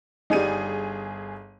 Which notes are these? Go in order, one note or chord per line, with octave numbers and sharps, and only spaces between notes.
G1 G3 D#4 G#4 D#7